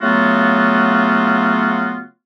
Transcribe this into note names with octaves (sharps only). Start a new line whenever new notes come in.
C#3 F#3 A3 B3 F4 F#4